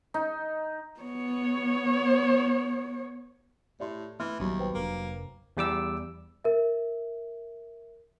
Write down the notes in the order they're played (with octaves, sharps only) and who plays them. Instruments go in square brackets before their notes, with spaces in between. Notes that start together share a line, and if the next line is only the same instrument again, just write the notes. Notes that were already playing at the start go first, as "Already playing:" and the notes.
[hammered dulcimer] D#4
[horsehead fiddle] B3 C#5
[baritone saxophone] A2 [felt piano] G4 [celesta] D5 E5 C6
[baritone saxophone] E3 [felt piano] A3 [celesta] E5 C6 F6
[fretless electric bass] A#1 B3 C#4 [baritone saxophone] D#2 [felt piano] F#3 G3
[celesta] B4 C5 G5
[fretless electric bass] F1 D4 [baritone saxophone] A#3
[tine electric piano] E2 G3 D6 E6
[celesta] A#4 E5